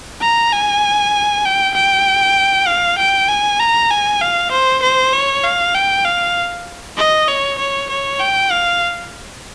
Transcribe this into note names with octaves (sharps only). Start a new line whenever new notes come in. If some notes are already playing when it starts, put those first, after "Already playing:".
A#5
G#5
G5
G5
F5
G5
G#5
A#5
G#5
F5
C5
C5
C#5
F5
G5
F5
D#5
C#5
C#5
C#5
G5
F5